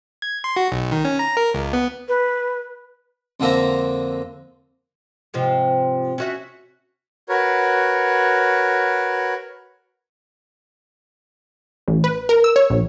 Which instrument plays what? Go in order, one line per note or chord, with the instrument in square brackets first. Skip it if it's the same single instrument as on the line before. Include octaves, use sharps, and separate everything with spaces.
[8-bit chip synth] G#6
C6
F#4
B1
D#3
C#4
A#5
A#4
C#2
B3
[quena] B4
[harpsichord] F2 D3 A#3 C4 E5 A#5
[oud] G#2 C3 F3
C#4 F#4 E5
[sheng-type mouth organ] F#4 A#4 B4 C#5
[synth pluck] A1
B4
A#4
E6
C#5
A#1